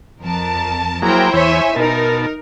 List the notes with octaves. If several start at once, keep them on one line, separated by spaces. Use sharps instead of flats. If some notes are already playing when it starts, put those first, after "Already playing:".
F2 A#4 A5
F#3 A#3 E4 G#4 A#4 C5 G5 A#5
E2 E3 C#5 E5 G#5
B2 D#4 A#4 A5